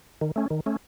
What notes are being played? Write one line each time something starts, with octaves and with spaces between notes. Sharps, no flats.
D#3
A3 C#4
D#3
A3 C#4